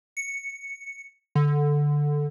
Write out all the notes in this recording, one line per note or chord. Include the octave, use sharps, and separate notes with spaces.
C#7
D3